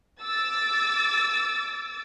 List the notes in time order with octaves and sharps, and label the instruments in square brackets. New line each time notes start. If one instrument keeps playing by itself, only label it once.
[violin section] D6 E6 A6